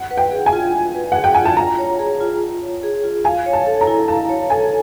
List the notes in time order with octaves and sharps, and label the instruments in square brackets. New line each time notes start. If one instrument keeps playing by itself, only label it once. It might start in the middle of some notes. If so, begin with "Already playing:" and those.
Already playing: [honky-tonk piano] F#5
[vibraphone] B4
[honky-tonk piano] G5
[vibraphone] G#4
[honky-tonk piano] G#5
[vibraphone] F4
F4
B4
[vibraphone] G#4 [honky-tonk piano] F#5
[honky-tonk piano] G5
[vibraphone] F4 [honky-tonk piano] G#5
[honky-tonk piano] A5
[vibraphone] F4 [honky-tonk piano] A#5
[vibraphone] C#5
G#4
F4
F4
C#5
G#4
F4
[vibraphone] F5 [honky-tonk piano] G#5
[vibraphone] C#5
[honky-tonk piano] A5
[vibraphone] A4
[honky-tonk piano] A#5
[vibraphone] E4
[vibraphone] F5 [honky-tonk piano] A5
[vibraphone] C#5
[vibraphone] A4 [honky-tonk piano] G#5